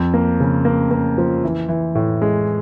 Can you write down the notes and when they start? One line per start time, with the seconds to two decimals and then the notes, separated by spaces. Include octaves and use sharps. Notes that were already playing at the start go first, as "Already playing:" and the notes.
Already playing: F2
0.14 A#3
0.40 C#3
0.65 A#3
0.91 A#3
1.18 F3
1.44 E3
1.69 E3
1.95 A2
2.22 G#3